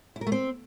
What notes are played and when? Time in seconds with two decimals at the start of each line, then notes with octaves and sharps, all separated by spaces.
0.16 E4
0.21 A#4
0.27 A3
0.32 C4